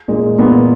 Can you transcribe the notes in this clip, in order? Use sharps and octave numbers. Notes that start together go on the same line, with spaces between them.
A#2 G#3
A#2 B3